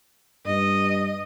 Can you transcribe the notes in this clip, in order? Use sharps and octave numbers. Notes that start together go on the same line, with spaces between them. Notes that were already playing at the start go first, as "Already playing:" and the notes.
G2 D#5